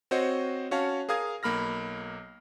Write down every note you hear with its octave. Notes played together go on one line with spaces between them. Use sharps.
C4 F#4 C5 C#5 D#5
C#4 F#4 C#5 F5 A5
G#4 A#4 F5 D#6 G#6
B1 A#3 B5 F6 A#6